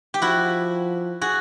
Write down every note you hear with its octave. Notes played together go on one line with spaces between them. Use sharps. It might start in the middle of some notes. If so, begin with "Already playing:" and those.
G4
F3 E4 F#4
F#4 G#4